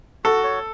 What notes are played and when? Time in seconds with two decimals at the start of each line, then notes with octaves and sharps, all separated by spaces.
0.25 F#4 A4
0.44 C#5